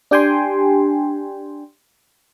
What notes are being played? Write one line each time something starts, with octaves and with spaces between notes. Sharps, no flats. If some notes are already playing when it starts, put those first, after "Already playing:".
D4 G4 G5 G#5 C6